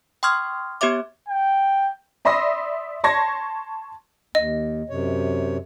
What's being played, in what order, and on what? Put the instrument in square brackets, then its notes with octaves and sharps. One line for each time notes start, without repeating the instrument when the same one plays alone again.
[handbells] G5 C6 C#6 D#6 F6 G#6
B3 G4 C#5 E5 D6
[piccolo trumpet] G5
[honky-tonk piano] D5 E5 B5 C6 D#6 A#6
A5 C6 C#6 G#6 A#6
[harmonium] D#2 [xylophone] D#5
[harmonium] F#2 C3 C#5